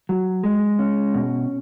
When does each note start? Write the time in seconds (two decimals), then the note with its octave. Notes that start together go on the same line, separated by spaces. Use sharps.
0.09 F#3
0.43 G#3
0.79 C#4
1.14 B2